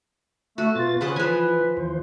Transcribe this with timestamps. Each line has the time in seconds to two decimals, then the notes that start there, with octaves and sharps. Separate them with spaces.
0.58 A3 F#4
0.75 B2 B3 F4 A6
1.01 C#3 G#4 B4 C5 F#5
1.16 E3 F3 B4 G#5
1.77 D#2 E3 C5